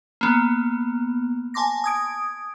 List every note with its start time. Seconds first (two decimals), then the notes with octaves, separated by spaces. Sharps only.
0.21 A#3 B3
1.54 G#5 A5 C6 D6 A#6
1.84 D#6 G#6 D7